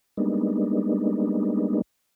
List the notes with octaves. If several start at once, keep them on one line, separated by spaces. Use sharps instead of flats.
G3 G#3 A#3 B3 D4 D#4